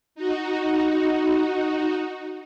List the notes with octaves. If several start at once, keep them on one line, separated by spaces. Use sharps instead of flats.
D#4 F#4